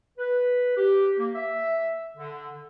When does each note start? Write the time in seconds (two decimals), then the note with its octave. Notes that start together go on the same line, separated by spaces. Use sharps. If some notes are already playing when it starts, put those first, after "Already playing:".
0.19 B4
0.77 G4
1.18 A#3
1.35 E5
2.17 D3